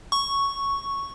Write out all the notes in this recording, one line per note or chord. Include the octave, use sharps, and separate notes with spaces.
C#6